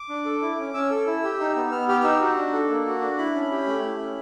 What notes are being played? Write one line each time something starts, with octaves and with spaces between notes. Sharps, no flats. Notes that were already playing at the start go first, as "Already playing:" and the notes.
Already playing: D6
D4
A4
E4
C#4
C#4 E6
A4
E4
G4
D#4
B3
B3 F6
G4 F6
F6
D#4 E6
F#4
D4
A4
A#3
F#4
D4
E4 B5
C#4
G4
A3
E4
C#4